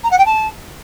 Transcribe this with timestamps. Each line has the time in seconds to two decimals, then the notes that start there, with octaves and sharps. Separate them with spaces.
0.04 A#5
0.11 F#5
0.18 G5
0.26 A5